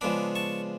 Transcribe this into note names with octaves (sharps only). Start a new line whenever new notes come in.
C#3 F3 G#3 B3 D4 B5 D6
A5 C#6